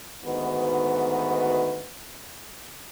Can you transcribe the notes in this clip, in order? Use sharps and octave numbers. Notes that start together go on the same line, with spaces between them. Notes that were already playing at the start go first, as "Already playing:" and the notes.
D2 G#2 D#3 B3 F#4 B4